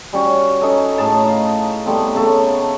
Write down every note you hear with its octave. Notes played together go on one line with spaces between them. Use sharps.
G3 C#4 F#4
C#4 D#4 A4
A2 G#4 A5 A#5
D#4 F5
G3 A3 B3 C4
C#3 A3 A4